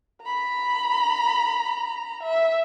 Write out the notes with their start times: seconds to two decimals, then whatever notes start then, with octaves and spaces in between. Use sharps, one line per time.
0.22 A#5 B5
2.23 E5